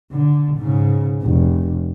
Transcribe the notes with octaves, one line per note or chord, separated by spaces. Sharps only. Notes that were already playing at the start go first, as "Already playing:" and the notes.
D3
G#2 C#3
F1